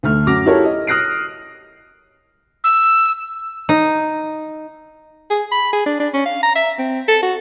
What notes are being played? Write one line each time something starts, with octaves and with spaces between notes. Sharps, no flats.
D2 A3 F6
F#2 F#4 D6 A#6 F7
E4 F#4 G4 A4 A#4 C#5
D#5
D#6 F6 F#6 A#6 C7 D7
E6
D#4
G#4
B5
G#4
D4
D4
C#4
F5
A#5
E5
C4
A4
F#4